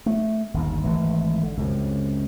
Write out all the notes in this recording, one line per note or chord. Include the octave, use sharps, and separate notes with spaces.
A3
G1 D#2
G#1 E3 A3
D3
C#2 F#2 C3